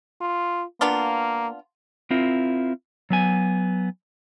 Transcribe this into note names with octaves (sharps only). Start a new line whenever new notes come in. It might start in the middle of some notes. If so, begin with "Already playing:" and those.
F4
A#3 B3 D4 F4
C4 E4 F4 A#4
F#3 B3 G#5